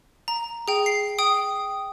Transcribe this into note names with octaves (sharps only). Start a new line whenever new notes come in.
A#5
G#4 G5
C7
G5 D#6